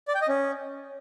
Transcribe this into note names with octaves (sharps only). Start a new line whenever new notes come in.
D5
G5
D#5
C#4